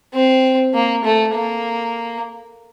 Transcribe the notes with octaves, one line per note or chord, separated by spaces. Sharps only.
C4
A#3
A3
A#3